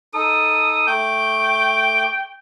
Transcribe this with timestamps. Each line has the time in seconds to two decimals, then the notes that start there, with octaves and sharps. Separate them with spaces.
0.14 D#4 A4 D#6
0.87 A3 G5 D6